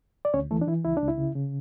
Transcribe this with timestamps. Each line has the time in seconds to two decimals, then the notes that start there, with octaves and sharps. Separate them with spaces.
0.25 D5
0.34 D2 C#4 C#5
0.51 E3 A3 A4
0.61 D4
0.67 E3 E4
0.85 C#2 E4
0.97 D4
1.02 C#2
1.08 E4
1.18 C#3
1.35 C#3